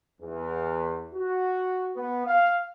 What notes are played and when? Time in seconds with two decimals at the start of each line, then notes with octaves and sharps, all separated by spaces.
0.21 E2
1.14 F#4
1.96 B3
2.26 F5